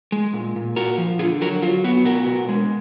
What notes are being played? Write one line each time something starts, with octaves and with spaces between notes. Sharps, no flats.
G#3
A#2
A#2
A#2 F#4 A#4
F3
D3 F4 G#4
F#3 F#4 A#4
F#3 F4
B3 F#4
B2 F#4 A#4
B2
G#3